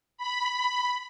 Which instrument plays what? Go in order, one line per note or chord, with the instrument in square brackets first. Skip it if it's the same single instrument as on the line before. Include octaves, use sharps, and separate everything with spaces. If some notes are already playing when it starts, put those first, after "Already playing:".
[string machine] B5